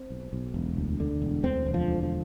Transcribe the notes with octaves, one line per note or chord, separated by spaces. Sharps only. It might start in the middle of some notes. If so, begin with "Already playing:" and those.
Already playing: C4
B1
B1
E1
D2
D3
E1
D2 C4
E1
F3
D3
F3